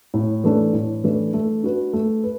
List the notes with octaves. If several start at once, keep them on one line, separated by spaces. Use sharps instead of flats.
A2
E3 A3 D4
A2
E3 A3 D4
A3
D4 F#4 B4
A3
B4